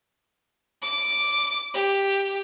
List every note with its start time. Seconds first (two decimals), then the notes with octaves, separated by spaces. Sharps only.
0.82 D6
1.74 G4